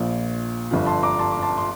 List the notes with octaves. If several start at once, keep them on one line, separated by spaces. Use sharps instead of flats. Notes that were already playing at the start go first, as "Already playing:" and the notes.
Already playing: A#1 A#2 F3
G1 G2 D3 F3
A5 C6
A#5 D6
A5 C6
D6
A5 C6
C6